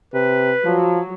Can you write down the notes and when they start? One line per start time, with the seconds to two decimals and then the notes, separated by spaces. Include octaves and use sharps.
0.14 C3 B4
0.65 F3 F#3